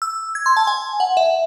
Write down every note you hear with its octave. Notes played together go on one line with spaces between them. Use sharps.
E6
G#6
C6
A5
G#5
F#5
E5